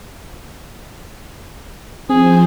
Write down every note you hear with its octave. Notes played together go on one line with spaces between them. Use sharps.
F3 C4 G#4 C5